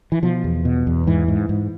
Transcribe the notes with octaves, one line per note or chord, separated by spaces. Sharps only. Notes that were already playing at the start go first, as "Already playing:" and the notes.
E3
B2 F3
E2
B2
E2
G#2 E3
G#2
G#2